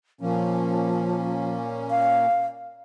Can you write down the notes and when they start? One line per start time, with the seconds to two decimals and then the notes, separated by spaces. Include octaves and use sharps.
0.21 A#2 F3 A#3 C#4
1.90 F5